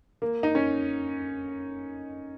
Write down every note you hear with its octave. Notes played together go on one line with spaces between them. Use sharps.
A#3
D#4
C#4